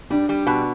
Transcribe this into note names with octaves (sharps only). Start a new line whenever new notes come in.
G3 D4
G3
B2